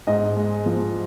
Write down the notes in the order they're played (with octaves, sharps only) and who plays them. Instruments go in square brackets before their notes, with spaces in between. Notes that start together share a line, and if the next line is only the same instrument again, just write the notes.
[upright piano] G#2 D#5
G#3
F3